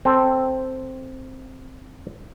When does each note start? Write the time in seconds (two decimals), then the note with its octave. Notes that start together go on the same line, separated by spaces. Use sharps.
0.05 C4 A4